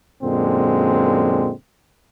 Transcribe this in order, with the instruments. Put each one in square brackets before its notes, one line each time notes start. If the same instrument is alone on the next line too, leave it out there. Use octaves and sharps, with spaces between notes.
[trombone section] F#2 A#2 D3 G#3 C4